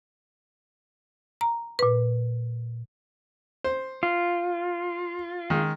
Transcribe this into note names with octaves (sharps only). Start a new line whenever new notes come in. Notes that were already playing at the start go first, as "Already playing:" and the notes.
A#5
A#2 B4
C5
F4
D#3 G#3